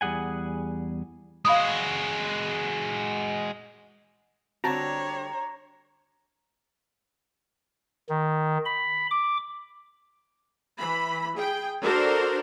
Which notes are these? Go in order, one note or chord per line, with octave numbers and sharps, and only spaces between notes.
E2 G3 G#4 F#5 G#5
G#3 F#4 F5 B5 D#6
D3 G3 C4 D4 F#4 C#5 A5 A#5
D#3
B5
D6
E3 B5
G#4 G5
D4 F#4 A4 A#4 C5